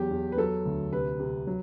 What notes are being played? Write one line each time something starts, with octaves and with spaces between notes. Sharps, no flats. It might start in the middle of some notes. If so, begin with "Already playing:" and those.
Already playing: E2 F#3 G4
E2
B4
F#3 A4
D2
C3 B4
C3
F#3